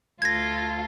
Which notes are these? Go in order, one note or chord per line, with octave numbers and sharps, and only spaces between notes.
D2 F4 A4 G#6 A#6